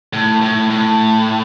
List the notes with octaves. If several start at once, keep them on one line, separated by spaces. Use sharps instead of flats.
A2
A2
A2